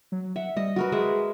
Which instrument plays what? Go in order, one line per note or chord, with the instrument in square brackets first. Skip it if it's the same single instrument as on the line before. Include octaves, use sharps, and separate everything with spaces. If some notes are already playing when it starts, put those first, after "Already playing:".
[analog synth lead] F#3
[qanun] E5 [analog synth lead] F#5
[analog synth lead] G3 [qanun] D#5
[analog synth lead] F#3 [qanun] F#4 A#4 B4
[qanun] G#3 E5 [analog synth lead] G#4